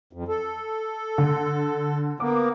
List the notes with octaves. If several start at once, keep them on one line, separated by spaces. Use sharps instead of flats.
F2
A4
D3
A#3 B3 D6